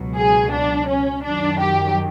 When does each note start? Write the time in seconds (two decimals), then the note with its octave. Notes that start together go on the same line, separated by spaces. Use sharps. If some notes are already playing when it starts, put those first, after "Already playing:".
Already playing: C#2 B2 F#3
0.16 G#4
0.52 D4
0.88 C#4
1.24 F#2 D#3 F#3 D4
1.60 G4